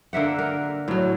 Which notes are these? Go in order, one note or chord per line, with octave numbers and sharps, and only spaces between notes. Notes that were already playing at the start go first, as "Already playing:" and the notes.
D3 A#3 E5 F#5
A#4
A2 F#3